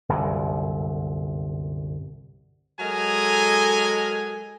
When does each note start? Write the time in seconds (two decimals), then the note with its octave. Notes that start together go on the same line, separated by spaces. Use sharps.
0.09 G1 C2 F#2 A#2
2.80 F#3 G#3 A4 A#4 D#5 G#5